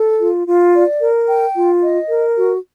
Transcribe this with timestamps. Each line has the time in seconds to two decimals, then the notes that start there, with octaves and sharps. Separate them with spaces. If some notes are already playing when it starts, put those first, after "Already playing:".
Already playing: A4
0.20 F4
0.47 F4
0.74 D5
1.01 A#4
1.28 G5
1.55 F4
1.82 D#5
2.09 A#4
2.36 F#4